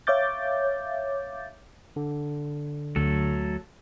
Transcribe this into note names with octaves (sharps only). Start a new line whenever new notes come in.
C#5 E5 F5 D6 G6 A6
D3
D2 F#3 A3 A4